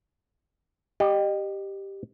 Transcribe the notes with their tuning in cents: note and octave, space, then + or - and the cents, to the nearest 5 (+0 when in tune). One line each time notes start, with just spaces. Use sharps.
G4 +0 D#5 -30